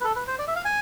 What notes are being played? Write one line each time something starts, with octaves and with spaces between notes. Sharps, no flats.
B4
A4
B4
C5
D5
E5
F5
G#5